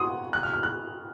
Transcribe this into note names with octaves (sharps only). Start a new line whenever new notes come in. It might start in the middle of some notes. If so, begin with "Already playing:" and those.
Already playing: F#5 C6 D#6
F#6
F6
F6
F#6